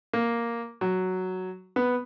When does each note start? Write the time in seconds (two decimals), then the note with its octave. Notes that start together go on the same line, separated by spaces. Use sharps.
0.13 A#3
0.81 F#3
1.76 B3